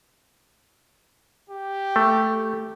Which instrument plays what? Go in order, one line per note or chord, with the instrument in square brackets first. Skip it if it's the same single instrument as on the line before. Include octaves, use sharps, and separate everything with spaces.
[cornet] G4
[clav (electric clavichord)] A3